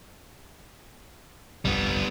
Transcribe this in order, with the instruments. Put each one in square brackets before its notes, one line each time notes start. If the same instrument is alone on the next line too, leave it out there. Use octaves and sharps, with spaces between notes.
[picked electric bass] G1 C2 F2 [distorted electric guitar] G3 B3